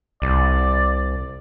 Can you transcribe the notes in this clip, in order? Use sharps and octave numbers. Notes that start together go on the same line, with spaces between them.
C2 D5